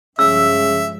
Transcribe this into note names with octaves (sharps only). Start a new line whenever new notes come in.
G2 C#3 F3 G#3 E5 E6